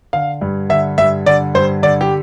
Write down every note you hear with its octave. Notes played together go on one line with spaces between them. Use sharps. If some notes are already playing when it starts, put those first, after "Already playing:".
D3 F5
G2
D3 E5
G2 E5
D3 D5
G2 C5
D3 D5
G4